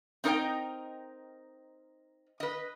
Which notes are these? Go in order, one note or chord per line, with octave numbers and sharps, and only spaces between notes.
C4 D#4 A#4 C#5 D#5 G5
B4 D#5